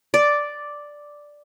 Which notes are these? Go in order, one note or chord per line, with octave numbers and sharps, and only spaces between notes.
D5